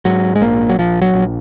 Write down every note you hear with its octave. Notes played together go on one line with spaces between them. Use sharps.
G#2 F#3
G#3
A#1 A#3
F#3
A#1 F3
F#3
A#1